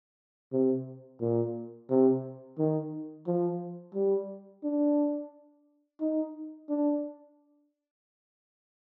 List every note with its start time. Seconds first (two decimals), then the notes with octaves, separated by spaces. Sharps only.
0.52 C3
1.21 A#2
1.90 C3
2.58 D#3
3.27 F3
3.94 G3
4.63 D4
6.00 D#4
6.69 D4